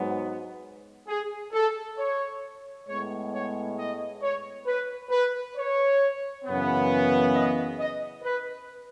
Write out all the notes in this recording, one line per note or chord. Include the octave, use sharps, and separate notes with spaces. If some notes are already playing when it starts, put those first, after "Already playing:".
Already playing: G#2 F#3 B3
G#4
A4
C#5
A2 G#3 B3 C#5
C#5
D#5
C#5
B4
B4
C#5
F#2 C#3 E3 B3
D#5
D#5
B4